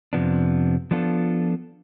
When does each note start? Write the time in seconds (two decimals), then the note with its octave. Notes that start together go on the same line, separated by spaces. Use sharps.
0.13 F2 C3 F3 B3 D4
0.91 F3 B3 D4 F4 A4